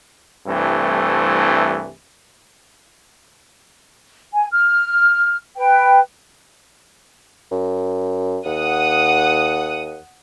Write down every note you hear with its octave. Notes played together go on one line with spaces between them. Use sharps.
C2 G2 E3 A3 C4
G#5
F6
B4 G5
F#2
D#2 F#5 D#6